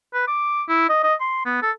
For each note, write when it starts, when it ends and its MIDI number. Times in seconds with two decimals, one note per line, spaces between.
0.14 0.27 71
0.27 0.62 86
0.69 0.88 64
0.90 1.02 75
1.03 1.14 75
1.20 1.42 84
1.46 1.62 59
1.62 1.71 69